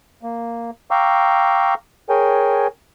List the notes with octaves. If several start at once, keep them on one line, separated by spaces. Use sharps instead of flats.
A#3
F5 G5 A#5 C#6 D6 E6
G#4 A#4 C#5 G5 G#5